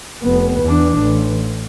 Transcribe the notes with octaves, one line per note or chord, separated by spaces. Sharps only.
F1 B3
E2 D4
A1